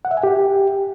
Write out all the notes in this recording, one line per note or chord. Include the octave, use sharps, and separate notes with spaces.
F#5
E5
G#5
G4